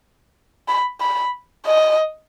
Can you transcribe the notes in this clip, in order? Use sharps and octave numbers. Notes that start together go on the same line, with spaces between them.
B5
B5
D#5